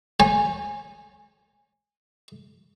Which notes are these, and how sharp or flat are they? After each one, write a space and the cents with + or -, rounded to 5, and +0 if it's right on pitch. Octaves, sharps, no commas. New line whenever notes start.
C#5 -45 G#5 -10